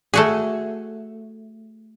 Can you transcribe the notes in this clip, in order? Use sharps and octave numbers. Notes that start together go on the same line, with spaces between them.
A3 F#4 G#4